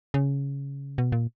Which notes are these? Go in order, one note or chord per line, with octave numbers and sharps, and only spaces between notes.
C#3
B2
A#2